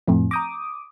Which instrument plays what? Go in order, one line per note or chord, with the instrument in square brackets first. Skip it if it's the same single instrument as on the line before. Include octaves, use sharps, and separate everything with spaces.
[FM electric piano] F2 A2 [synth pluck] F3 A3 C4
[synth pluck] A#5 G6 A#6 [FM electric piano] D6 D#6